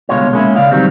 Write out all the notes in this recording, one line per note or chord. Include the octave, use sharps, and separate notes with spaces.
C2 B2 D3 G#3 F4 C#5
G#3 A#3 C#4 E4
C#3 D5 F5
D#3 F#3 G3 C4